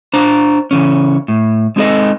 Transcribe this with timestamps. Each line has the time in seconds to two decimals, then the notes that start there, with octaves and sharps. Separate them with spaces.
0.14 D4 C5 A#5
0.71 C#3 E3 C#4
1.28 A2
1.76 G#3 C4 D#4 G4 A4 D#5